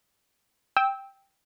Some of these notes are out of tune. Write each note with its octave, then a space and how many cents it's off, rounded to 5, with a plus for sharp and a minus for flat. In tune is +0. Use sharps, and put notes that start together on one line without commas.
G5 +0 E6 -20